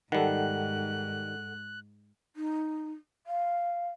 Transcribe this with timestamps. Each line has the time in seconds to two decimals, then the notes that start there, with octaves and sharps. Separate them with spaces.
0.12 G#2 D#3 G3 A4 F#5 F#6
2.36 D#4
3.27 F5